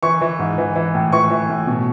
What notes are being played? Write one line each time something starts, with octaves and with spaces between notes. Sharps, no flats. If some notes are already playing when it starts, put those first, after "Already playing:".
E3 C#6
E3
G#2
E3
E3
A2
E3 C#6
E3
A2
B2